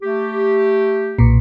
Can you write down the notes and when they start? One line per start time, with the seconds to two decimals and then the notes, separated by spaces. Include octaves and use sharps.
0.03 A3 G4
1.19 B1 A#2